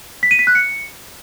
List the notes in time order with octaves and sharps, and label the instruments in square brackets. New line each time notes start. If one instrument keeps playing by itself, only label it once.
[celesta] B6
D#7
B6
F#6
C#7